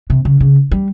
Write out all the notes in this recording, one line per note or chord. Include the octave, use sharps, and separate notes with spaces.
C3
C#3
C#3
G3